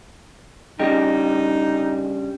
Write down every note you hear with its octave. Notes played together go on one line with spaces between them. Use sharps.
G2 C#3 G3 D#4 G#4 D#5 G5